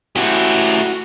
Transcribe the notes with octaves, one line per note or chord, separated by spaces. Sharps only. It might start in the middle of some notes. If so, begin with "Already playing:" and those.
A3 C#4 E4 F#4 G4